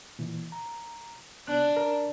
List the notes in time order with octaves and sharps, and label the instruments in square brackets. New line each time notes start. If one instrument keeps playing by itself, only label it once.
[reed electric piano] A#2 E3
A#5
[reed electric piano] C2 B3 F#6 [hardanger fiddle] D4
[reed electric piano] A#4